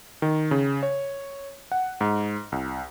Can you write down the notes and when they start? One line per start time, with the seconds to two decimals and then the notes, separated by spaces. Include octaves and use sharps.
0.22 D#3
0.51 C#3
0.83 C#5
1.72 F#5
2.01 G#2
2.52 C2